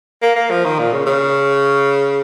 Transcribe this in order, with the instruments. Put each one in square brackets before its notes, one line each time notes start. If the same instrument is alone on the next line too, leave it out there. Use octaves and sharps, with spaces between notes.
[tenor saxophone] A#3
A#3
F3
D#3
A#2
C#3
C#3